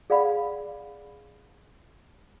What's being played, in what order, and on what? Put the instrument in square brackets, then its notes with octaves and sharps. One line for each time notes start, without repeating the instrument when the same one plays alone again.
[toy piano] G#4 D5 F5 F#5 B5